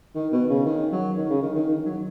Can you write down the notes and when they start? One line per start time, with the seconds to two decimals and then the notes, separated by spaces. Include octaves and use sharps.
0.15 D#3
0.32 B2
0.49 C#3
0.66 D#3
0.92 F#3
1.18 D#3
1.30 C#3
1.42 D#3
1.56 D#3
1.69 D#3
1.85 F#3